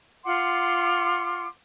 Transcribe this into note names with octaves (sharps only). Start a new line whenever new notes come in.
F4 F#5 C6 D6